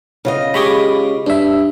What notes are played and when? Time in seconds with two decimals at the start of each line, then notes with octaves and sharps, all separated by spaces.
0.25 C#3 F4 D#5
0.54 G#3 G4 G#4 B5 C#6 D6
1.26 G2 D4 E5